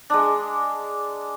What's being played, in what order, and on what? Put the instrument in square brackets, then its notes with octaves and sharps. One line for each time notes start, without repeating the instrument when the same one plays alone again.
[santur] G#3 D4